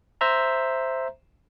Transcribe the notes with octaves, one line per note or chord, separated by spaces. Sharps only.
C5 E5 A#5